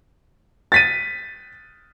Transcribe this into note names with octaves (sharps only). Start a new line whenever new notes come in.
A6 B6 D#7